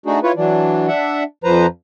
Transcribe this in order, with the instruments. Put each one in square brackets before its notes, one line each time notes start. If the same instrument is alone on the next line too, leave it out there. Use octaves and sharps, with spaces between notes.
[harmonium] A3 D4 D#4 F#4 G#4
E4 F4 B4 C#5
E3 F#3 D4
D4 E5 F#5
F2 F3 B4 C5 A#5